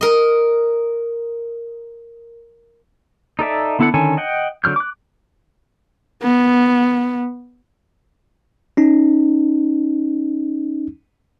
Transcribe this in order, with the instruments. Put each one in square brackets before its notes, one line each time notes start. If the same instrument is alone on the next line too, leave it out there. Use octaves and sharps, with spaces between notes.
[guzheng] A#4 D#5
[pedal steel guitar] D#4 A4 D5 E5
D3 B3 E4 A4 F#5
D3 D#3 C#4 A4 G#5
D#5 F#5 G5
D3 F#3 F6 G6
D6 F#6
[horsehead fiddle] B3
[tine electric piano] C#4 D#4